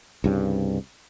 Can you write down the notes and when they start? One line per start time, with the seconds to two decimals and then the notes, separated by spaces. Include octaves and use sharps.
0.24 C2 G2 C#3